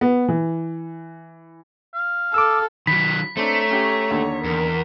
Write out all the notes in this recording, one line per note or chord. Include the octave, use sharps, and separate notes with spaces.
B3
E3
F5
A4 D6 E6
D#3 F#3 B5 B6
A3 C4 D4 C#5 A#5
C#4 G4
D#2 D3
E2 A#4